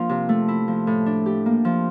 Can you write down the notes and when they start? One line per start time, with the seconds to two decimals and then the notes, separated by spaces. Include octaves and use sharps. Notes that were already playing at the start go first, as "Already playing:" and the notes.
Already playing: F3 A#3 D4 F4
0.09 C3
0.29 A3
0.48 E4
0.68 F3
0.87 A2
1.06 D4
1.26 G4
1.46 A#3
1.65 F3